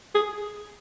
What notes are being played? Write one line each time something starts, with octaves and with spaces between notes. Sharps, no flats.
G#4